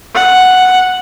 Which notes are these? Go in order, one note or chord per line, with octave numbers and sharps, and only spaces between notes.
F#5